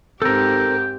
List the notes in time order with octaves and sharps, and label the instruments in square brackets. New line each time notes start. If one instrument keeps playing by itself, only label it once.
[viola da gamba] G#2 G4 [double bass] C4 [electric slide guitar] A4 A#4 [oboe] G5